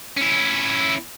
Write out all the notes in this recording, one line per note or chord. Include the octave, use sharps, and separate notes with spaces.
C#4 E4